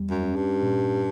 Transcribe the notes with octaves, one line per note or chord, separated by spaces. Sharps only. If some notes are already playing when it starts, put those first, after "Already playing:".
Already playing: E2 G3
F#2
C#4
G2
A#2